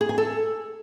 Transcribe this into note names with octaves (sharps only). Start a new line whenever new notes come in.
G#4
G#5
A4